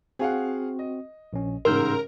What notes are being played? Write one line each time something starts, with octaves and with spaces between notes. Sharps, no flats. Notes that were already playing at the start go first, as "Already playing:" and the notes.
C4 F#4 G#4 F5 F#5
D#5
A#1 C#4
A1 G#2 C#3 A#4 C6 E6 G6